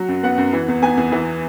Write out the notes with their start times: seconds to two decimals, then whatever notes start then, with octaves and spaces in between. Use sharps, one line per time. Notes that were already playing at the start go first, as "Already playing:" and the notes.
Already playing: F#3 F#5
0.08 F#2
0.23 B3 F#5
0.38 F#2
0.53 E3
0.68 E2
0.82 B3 G#5
0.97 E2
1.12 E3